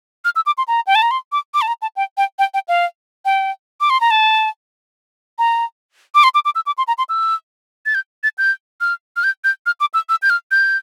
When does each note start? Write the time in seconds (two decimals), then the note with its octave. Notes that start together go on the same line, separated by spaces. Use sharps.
0.25 F6
0.36 E6
0.46 D6
0.58 C6
0.68 A#5
0.87 G5
0.95 A5
1.02 A#5
1.11 C6
1.32 D6
1.54 D6
1.61 A5
1.68 A#5
1.82 A5
1.96 G5
2.17 G5
2.39 G5
2.54 G5
2.68 F5
3.25 G5
3.81 D6
3.90 C6
4.01 A#5
4.11 A5
5.39 A#5
6.15 D6
6.23 C6
6.34 D6
6.45 D6
6.55 E6
6.66 D6
6.78 C6
6.88 A#5
6.98 C6
7.09 E6
7.86 A6
7.95 G6
8.23 A6
8.38 G6
8.81 F6
9.16 F6
9.24 G6
9.44 G6
9.66 F6
9.80 D6
9.94 E6
10.09 E6
10.22 G6
10.30 F6
10.51 G6